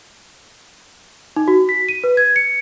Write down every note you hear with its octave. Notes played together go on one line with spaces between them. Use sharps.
D#4
F#4
B6
D#7
B4
G#6
C#7